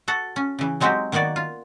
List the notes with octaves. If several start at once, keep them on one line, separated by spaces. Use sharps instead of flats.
F#4 A4 F#5
C#4
C#3 E3
F#3 G#3 C4 D#4 F#4 G4
D#3 A#3 B3 F#4 D5
F4